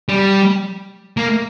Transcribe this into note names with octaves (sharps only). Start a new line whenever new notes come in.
G3
A#3